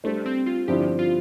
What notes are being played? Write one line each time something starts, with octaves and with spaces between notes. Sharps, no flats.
G3 A3 D4 A4 C5
C4
F4
G2 D3 F3 C4 E4 G4
F4